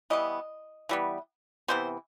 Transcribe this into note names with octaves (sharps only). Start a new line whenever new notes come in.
E3 G3 B3 D#5
E3 G3 B3
C3 E3 B3 C5